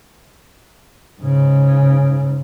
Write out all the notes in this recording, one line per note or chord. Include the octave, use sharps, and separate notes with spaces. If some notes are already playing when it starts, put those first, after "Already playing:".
G#2 C#3